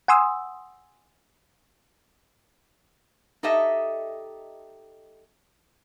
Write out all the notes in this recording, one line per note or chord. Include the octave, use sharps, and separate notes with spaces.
F#5 G#5 C6 D#6 E6
D#4 G4 A4 D#5 E5